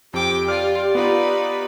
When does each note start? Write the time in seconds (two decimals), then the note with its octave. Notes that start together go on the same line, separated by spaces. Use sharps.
0.14 F2 C4 G4 G5 D6
0.48 F4 D5 F6
0.95 B3 D#4 F4 B4